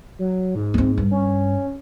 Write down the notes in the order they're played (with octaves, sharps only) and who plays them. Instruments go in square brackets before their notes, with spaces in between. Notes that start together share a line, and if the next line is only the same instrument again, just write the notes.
[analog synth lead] F#3
G#2
[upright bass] B3 C4
G2
[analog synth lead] C#4